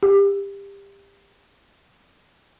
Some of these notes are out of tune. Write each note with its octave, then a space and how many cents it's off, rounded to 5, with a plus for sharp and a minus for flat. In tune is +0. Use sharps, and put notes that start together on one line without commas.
G4 +25